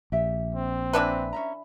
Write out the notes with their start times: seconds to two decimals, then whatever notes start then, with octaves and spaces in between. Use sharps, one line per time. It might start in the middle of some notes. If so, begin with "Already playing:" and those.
0.12 A#1 G4 E5
0.55 C4
0.93 E3 D4 B4
1.33 C#4 E5 A#5